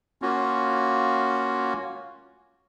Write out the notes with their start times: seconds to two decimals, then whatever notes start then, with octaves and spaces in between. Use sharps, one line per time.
0.22 A#3 C#4 F4 F#4